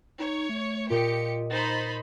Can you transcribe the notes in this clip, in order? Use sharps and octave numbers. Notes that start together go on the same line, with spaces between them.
D#4 C#5
A3
A#2 F4 G4 D#5 A#6 C#7
D#4 C5 B5 A6